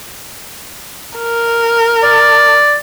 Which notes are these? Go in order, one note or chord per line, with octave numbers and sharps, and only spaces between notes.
A#4
D5